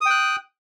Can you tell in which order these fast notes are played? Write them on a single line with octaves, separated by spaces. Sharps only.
D#6 G5 F#6